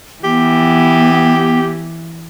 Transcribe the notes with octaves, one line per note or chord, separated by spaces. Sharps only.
E3 B3 G4